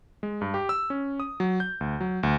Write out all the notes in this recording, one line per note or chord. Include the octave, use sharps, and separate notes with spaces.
G#3
G2
G4
E6
C#4
D#6
F#3
G6
D2
F#3
D2